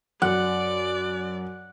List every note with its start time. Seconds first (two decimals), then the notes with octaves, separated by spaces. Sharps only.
0.22 F#2 D5 F#5